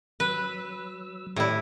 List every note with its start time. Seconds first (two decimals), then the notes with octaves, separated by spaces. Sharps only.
0.20 F#3 B4 E6
1.36 A2 E4 G4 D5